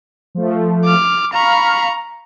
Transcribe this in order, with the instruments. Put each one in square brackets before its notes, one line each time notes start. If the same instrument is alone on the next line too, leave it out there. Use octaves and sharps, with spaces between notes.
[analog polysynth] F3 A3
[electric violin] D6 F6
[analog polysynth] F5 B5 F6 [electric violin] A#5 C#6